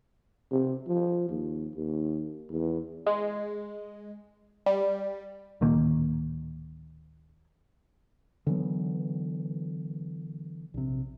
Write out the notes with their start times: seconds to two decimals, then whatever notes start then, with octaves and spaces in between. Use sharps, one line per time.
0.51 C3
0.87 F3
1.29 D#2
1.75 D#2
2.51 E2
3.06 G#3
4.66 G3
5.61 D1 A#2 D#3 A#3
8.47 D3 E3 F#3 B3
10.74 A#1 C3